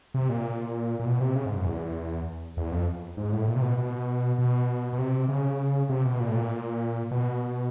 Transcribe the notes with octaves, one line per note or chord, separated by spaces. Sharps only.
C3
A#2
A#2
B2
C3
C#3
G#2
F#2
E2
E2
F2
G#2
A2
A#2
C3
B2
B2
B2
B2
C3
C#3
C3
B2
A#2
A2
A#2
B2